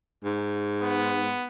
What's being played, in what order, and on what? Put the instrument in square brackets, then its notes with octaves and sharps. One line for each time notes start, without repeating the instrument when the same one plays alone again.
[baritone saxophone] G#2
[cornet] B3